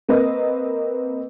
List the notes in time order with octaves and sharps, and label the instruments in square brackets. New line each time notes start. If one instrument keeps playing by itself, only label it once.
[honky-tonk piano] A#3 C4 B4 D#5